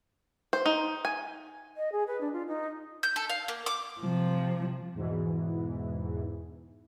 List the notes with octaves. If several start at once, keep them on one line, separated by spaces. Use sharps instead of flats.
C5
D#4
G#5
D#5
G#4
B4
D4
F4
D#4
G6
A4
F5
A#3
D6
C3 F3
E2 G#2 B2 E3